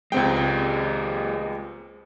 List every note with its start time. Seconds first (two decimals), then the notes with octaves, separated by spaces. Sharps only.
0.12 C#2 G#3 C4 G4 G5